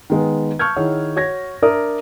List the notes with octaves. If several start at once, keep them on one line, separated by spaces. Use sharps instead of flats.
D#3 G#3 B3
A5 C#6 E6 F6 G6 G#6
D#3 E4 G#4 C#5 F#5
F#4 C#5 G#6 A#6
D4 A#4 D5 E5 D#6